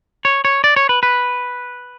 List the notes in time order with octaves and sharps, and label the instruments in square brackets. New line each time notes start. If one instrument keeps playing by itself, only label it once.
[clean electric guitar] C#5
C#5
D5
C#5
B4
B4